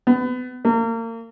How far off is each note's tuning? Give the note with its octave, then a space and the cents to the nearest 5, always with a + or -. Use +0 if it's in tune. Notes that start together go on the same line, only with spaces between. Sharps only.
B3 +30
A#3 -35